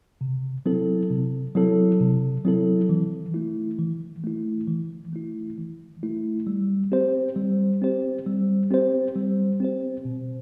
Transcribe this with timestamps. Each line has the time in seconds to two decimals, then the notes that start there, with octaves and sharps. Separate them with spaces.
0.21 C3
0.66 F#3 C4 E4 A4
1.10 C3
1.55 F#3 C4 E4 A4
2.00 C3
2.45 F#3 C4 E4 A4
2.89 E3
3.34 A3 E4
3.79 E3
4.24 A3 E4
4.68 E3
5.13 A3 E4
5.58 E3
6.03 A3 E4
6.47 G3
6.92 C4 G4 C5
7.36 G3
7.82 C4 G4 C5
8.26 G3
8.71 C4 G4 C5
9.16 G3
9.60 C4 G4 C5
10.05 B2